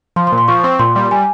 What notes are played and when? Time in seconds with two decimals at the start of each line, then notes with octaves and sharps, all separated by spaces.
0.16 F3 C6
0.27 C6
0.32 A#2
0.38 C6
0.48 F3 C#6
0.64 C4
0.79 A#2 C6
0.95 G3 C6
1.11 G3 G#5